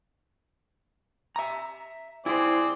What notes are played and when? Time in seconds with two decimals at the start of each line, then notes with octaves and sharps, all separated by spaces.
1.36 E5 A#5
2.26 C4 E4 G#4 C5 D5